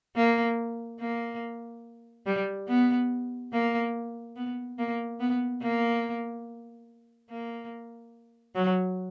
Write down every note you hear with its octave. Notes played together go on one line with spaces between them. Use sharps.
A#3
A#3
G3
B3
A#3
B3
A#3
B3
A#3
A#3
F#3